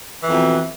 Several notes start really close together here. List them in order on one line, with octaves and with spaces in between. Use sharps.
E3 F2 B2